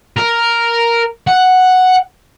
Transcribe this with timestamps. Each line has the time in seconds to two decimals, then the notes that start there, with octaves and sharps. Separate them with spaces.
0.17 A#4
1.27 F#5